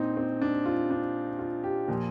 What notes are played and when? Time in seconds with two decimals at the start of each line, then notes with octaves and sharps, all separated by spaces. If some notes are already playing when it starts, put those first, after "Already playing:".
Already playing: A#2 C4 D4 D#4
0.17 C4
0.42 D4
0.66 F4
0.91 D4
1.39 F4
1.64 G4
1.88 A#2 F3